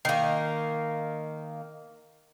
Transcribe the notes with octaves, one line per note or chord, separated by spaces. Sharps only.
D#3 A#3